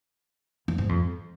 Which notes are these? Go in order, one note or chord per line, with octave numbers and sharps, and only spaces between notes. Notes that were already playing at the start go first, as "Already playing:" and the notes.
F2
G#2
F2